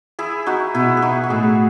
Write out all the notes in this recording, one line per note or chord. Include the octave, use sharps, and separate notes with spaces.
E4 G#4
D#4 F#4
B2 B3 E4
G#4
D#4 F#4
F#4
A2 A3 E4 G#4